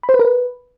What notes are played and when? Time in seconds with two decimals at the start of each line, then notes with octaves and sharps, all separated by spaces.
0.03 B5
0.09 C5
0.14 B4
0.19 A#4
0.25 B4